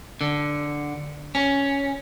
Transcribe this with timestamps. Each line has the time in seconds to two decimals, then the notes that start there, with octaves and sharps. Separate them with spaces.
0.21 D3
1.35 C#4